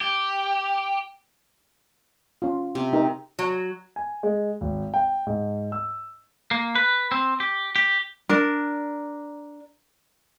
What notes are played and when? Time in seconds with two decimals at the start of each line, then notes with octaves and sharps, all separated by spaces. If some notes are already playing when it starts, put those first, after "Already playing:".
0.01 G4
2.42 C#4 F4
2.75 C3
2.93 D#4 G4 A#4
3.39 F#3
3.96 G#5
4.23 G#3
4.61 G#1
4.94 G5
5.27 G#2
5.72 E6
6.51 A#3
6.75 B4
7.12 C4
7.40 G4
7.76 G4
8.29 D4 A#4